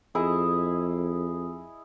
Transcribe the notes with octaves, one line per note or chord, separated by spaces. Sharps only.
F2 E4 G#4 D#5